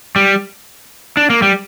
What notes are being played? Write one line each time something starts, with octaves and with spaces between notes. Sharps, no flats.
G3
D4
A#3
G3